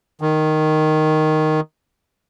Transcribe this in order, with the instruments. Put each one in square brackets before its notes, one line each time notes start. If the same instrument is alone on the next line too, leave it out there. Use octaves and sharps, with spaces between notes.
[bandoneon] D#3